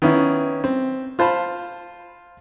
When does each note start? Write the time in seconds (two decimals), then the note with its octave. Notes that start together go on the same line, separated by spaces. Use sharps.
0.02 D#3 B3 C#4 E4
0.64 C4
1.19 F4 C5 A5 B5